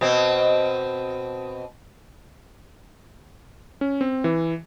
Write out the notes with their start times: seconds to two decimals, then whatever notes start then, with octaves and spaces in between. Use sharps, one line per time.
0.01 B2 C4
3.81 C#4
4.01 C4
4.24 E3